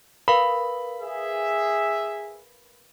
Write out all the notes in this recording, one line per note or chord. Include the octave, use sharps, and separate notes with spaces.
A#4 B4 F5 B5
G#4 E5